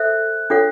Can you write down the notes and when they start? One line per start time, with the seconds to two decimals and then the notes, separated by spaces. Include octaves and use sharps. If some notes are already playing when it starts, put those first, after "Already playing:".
Already playing: A4 C5 E5 F#6
0.50 D4 F4 A4 C#5 F#5